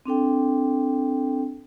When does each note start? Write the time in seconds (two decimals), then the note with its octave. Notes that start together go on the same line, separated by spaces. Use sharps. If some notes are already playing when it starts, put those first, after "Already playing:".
0.05 C4 D4 A4 G5